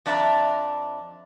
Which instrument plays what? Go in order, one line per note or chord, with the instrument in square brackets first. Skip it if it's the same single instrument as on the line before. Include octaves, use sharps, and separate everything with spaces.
[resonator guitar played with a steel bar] F2 D4 D5 E5 A#5